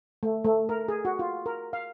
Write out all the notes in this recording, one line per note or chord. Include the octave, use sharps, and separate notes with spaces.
A3
A3
A#4
G#4
F#4
F4
A#4
F5